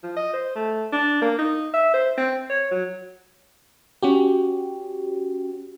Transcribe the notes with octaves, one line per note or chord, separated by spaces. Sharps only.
F3
D#5
C5
A3
D4
A#3
D#4
E5
C5
C4
C#5
F#3
C#4 F#4 G4